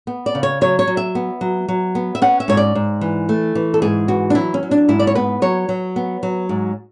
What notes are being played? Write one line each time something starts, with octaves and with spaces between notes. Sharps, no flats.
B3
D5
C#3
C#5
F#3 C#5
C#5
F#3
E5
B3
F#3
F#3
B3
E5
C#4 F#5
E5
G#2 C#5
D5
G#2
E3
A3
E3
A4
G#2 G#4
E3 F#4
D4
F#3 E4
C#4
F#3
D4
G#2 E4
D5
C#5
B3 B4
F#3 C#5
F#3
B3
F#3
G#2